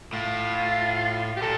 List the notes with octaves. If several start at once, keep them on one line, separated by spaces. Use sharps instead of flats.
A2 F4
G4
A#2 A4